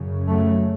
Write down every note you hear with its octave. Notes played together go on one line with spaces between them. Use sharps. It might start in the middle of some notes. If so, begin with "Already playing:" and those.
Already playing: F#2 C#3
F#3 A3